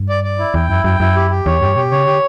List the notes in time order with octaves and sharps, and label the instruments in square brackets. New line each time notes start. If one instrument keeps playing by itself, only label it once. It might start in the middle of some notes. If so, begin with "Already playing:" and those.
Already playing: [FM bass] G2
[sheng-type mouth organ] D5
D5
E4
[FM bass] E2 [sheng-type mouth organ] G5
[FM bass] F#2 [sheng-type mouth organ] E4
[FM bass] F#2 [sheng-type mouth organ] G5
[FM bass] F#2 [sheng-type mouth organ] E4
[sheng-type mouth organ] G4
G4
[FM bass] E2 [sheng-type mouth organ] C#5
[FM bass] G2 [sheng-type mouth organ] G4
[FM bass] B2 [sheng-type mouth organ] G4
[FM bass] C#3 [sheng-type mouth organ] C#5
[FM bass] D3 [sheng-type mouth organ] G4